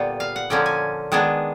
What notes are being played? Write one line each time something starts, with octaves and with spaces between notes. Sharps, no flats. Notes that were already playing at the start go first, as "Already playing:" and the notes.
Already playing: A#2 D3 G3 B3
F5
F#5
D3 F3 A#3 C#4 G5
G#5
D#3 G#3 B3 D4